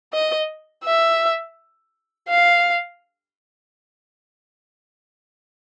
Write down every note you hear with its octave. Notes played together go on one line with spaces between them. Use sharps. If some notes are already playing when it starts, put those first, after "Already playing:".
D#5
E5
F5